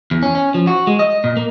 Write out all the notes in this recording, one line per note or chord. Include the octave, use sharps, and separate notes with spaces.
E2
C#4
C#4
F3
F#4
G#3
D#5
A#2
A#3